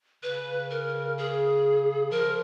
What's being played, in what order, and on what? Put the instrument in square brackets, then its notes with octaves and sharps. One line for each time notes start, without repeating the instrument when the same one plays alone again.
[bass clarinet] C#3 [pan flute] B4
[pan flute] A#4
G#4
[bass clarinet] F3 [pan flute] A#4